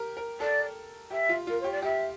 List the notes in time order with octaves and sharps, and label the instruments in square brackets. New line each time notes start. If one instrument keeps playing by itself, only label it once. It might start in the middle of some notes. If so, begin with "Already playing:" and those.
Already playing: [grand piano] G4 A#4
A#4
[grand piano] A4 [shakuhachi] D5
[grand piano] G4 [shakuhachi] E5
[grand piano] F4
[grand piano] F4 [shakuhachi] A#4
[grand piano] G4 [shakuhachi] C#5
[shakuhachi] D5
[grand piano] G4 [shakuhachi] E5